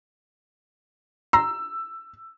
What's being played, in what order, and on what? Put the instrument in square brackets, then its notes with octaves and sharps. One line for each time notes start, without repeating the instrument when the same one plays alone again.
[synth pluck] A#5 C6 [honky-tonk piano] E6